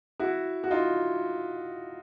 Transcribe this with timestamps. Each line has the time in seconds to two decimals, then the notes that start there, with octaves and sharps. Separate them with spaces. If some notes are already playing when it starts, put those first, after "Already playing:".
0.20 E4 F#4
0.64 F#4
0.71 D#4 F4